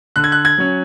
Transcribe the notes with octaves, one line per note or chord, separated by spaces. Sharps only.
D3 F#6
G#6
F#6
G#6
F#3 C#4